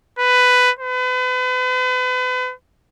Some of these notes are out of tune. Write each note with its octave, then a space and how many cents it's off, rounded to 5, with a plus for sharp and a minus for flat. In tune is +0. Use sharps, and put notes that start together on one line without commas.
B4 +10
B4 +40